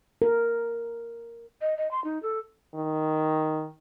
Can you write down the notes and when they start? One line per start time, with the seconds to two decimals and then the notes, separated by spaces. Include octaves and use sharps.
0.22 A#4
1.61 D#5
1.77 D#5
1.91 C6
2.04 D#4
2.23 A4
2.75 D#3